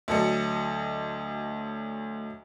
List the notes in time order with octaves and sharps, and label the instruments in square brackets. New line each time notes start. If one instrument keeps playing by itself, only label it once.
[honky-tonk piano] D2 F#3 A4 D#5 C#7